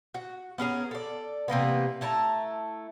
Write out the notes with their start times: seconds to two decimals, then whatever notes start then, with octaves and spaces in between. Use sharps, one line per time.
0.14 F#4
0.58 B3 C#4 G#4 A#4
0.91 A4 D5
1.48 C3 E3 A#3 B3
2.01 A3 E4 A5 A#5